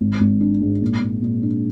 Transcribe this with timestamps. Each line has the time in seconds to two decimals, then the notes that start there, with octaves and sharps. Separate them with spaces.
0.01 G#1
0.20 G#1
0.41 D4
0.61 G#2
0.82 A#2
1.02 A#2
1.22 A#2
1.43 D4